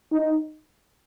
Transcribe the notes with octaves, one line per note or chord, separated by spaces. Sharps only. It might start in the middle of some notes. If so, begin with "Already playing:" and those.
D#4